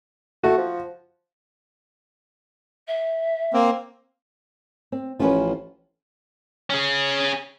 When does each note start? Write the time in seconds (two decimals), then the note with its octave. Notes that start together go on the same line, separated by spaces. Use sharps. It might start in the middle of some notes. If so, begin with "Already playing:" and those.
0.44 A3 F#4
0.57 F3
2.87 E5
3.53 A#3 C4
4.92 C4
5.19 A1 F3 C#4 B4
6.70 C#4 G#4